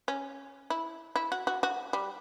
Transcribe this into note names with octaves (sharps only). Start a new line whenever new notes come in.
C#4
E4
E4
F#4
F#4
F#4
G3